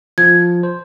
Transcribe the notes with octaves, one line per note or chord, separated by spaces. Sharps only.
F3 G#6
C5